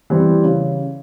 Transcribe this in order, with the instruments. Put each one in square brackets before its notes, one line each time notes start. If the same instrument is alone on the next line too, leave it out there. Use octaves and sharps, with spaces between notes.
[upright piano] E3 G3 C4
C#3